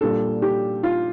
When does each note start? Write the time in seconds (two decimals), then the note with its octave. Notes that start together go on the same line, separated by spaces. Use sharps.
0.01 A#2 G3 D4 A4
0.42 G4
0.83 F4